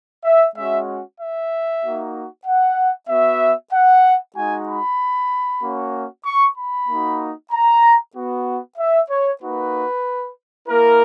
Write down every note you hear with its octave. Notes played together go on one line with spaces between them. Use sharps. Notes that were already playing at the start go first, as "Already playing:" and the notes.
E5
G#3 C#4 F#4 E5
E5
A#3 D#4 F#4
F#5
B3 F#4 E5
F#5
G#3 D#4 F#4 G#5
B5
A#3 C#4 F#4
C#6
B5
A#3 D#4 F#4
A#5
B3 F#4
E5
C#5
A#3 D#4 F#4 B4
A#3 E4 A#4